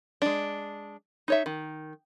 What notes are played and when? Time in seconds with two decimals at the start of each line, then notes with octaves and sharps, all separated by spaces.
0.22 G#3 D4
1.28 D#4 C#5 E5
1.46 D#3